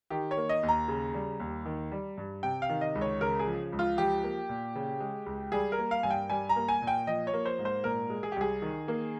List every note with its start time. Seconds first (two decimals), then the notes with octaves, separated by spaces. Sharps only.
0.10 D#3 G4
0.31 C#5
0.37 A#3
0.49 D#5
0.63 D#2
0.68 A#5
0.88 C#3
1.14 G3
1.40 D#2
1.65 D#3
1.92 G3
2.18 G2
2.43 C3 G5
2.62 F5
2.69 D#3
2.81 D#5
2.95 C#2
3.01 C#5
3.21 C#3 A#4
3.39 G#4
3.47 F3
3.72 C#2
3.79 F4
3.97 F3 G4
4.23 A#3
4.49 A#2
4.75 C#3
5.00 G#3
5.26 C#2
5.52 G3 G#4
5.72 A#4
5.79 A#3
5.91 F5
6.03 G2 G#5
6.11 G5
6.30 G3 G#5
6.49 A#5
6.56 A#3
6.69 G#5
6.82 A#2
6.87 G5
7.07 F3 D#5
7.27 C#5
7.33 A#3
7.45 C5
7.59 G#2
7.65 C5
7.84 A#2 A#4
8.10 G#3
8.23 G#4
8.32 G4
8.36 C2 G#4
8.62 D#3
8.88 A#3